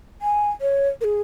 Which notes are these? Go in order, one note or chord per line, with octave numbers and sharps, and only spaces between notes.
G#5
C#5
A#4
G#4